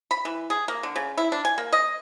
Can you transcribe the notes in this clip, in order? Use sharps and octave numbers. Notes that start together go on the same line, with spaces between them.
B5
E3
G#4
A#3
D3
C#3
E4
D4
G#5
A#3
D#5